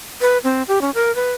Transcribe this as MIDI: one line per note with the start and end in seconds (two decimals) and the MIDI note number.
0.21 0.38 71
0.44 0.63 60
0.68 0.79 67
0.81 0.90 61
0.95 1.14 70
1.15 1.33 71